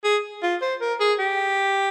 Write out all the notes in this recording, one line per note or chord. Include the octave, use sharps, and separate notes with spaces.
G#4
F4
C5
A#4
G#4
G4